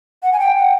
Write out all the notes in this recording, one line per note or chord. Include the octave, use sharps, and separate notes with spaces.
F#5
G#5
G5
F#5